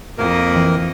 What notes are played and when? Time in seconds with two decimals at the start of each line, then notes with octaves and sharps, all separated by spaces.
0.18 F2 A#3 A#4 D#5
0.56 E3